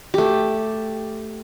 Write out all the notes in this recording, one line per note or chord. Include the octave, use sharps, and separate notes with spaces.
A3 G4